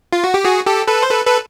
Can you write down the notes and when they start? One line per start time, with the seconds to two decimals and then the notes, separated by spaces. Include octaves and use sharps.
0.13 F4
0.24 F#4
0.34 G4
0.44 F#4 G#4
0.66 G4 A4
0.87 A4 B4
1.02 C5
1.10 A4 B4
1.26 A4 B4